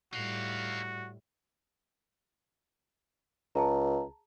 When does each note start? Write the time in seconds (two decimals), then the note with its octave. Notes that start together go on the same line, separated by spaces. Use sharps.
0.13 A2 G3 D#4 F#4 F5
3.55 C#2 G#4 A5 A#5